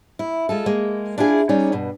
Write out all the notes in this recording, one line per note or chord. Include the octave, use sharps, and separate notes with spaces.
E4
G#3 F4 A4
G#3 A#3
D4 E4 F4 G#4
G3 C#4 D#4 G#4 C#5 D5
G2 B2